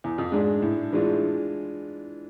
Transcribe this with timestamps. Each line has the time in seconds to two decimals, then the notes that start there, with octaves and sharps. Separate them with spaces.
0.04 E2
0.18 F2
0.32 G#2 G#3 D4 G#4
0.62 A2
0.93 E3 G#3 D4 F4